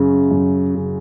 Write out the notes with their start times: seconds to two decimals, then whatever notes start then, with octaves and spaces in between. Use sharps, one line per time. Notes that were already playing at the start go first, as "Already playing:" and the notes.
Already playing: F#2 C#3
0.31 F#2
0.75 C#3